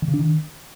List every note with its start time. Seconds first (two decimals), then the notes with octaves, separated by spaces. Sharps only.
0.02 D#3
0.08 C#3
0.14 D4
0.19 D#3